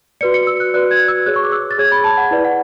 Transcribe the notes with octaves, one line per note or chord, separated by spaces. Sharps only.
F#4 B4 D5 C#7
C#7
E6
F#6
F#4 B4 D5 F#6
G#6
E6
G#4 C#5 F#6
C#6
D6
E6
A6
G#4 C#5 G#6
B5
A5
F#5
E4 B4 D5
F#5